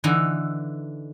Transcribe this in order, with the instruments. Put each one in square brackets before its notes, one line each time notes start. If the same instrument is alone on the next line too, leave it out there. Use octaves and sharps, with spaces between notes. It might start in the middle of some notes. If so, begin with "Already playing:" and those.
[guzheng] D3 E3 D#4